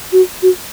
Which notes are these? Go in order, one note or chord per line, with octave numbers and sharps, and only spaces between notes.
F#4
F#4